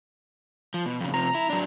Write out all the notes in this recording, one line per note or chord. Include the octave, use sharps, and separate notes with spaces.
F3
B2
F2 C#3
C3 F3 A#5
E4
F#3 D4